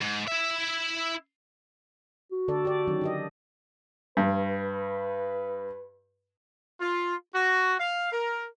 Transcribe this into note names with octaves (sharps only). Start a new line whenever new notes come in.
G#2
E4 E5
F#4
D3 A4 D5
G4 D5
D#3 F#3 C#4
D4 G4 D#5
G2 B4
F4
F#4
F5
A#4